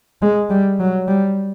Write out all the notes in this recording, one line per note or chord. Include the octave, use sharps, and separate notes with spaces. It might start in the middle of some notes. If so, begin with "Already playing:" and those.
G#3
G3
F#3
G3